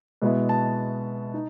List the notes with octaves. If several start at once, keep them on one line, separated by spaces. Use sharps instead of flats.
B2 G#3 B3 E4
A5
D#4